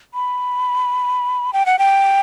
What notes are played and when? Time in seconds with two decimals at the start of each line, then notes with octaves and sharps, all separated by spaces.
0.14 B5
1.53 G5
1.66 F#5
1.79 G5